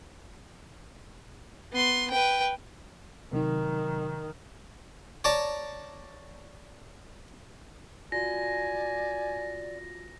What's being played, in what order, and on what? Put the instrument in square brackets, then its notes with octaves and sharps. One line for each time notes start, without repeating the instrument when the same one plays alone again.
[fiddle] B3 C6
B4 G5
[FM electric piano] C3 F#3 D#4 [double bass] D#3
[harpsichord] C#5 D5 A5 A#5
[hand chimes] F4 F#4 [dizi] D5 [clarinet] G#5 [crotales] A#6